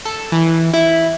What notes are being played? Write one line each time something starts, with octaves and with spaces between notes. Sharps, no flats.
A4
E3
E4